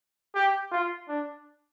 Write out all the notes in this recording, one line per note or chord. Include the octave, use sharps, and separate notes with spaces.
G4
F4
D4